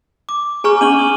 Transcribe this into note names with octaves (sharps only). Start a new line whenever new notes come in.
D6
G#4 G#5 A#5 C#6 F6
C#4 D4 C#6 D#7 F#7 G7
D#6